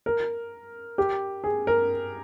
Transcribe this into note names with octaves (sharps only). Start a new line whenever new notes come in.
A#4
G4
G#4
A#4